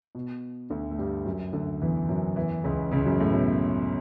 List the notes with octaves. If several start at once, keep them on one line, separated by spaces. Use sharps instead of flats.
B2
D2 D3
A3
G2 G3
F#2 F#3
D2 D3
E2 E3
F#2 F#3
E2 E3
C#2 C#3
C#2 C#3
F#2 F#3
A2
B2